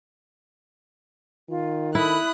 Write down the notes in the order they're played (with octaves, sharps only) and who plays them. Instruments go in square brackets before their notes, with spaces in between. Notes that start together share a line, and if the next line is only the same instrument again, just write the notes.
[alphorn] D#3 [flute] F4
[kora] E4 [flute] A4 [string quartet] B5 D#6 F#6